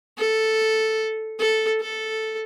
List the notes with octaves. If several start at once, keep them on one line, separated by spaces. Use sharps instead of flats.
A4
A4
A4